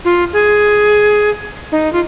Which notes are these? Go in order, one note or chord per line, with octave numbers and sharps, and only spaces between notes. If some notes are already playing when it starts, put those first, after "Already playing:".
F4
G#4
D#4
F4